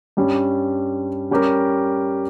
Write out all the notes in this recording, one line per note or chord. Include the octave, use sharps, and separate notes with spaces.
G2 G3 C#4
G3 C#4 G4 A#4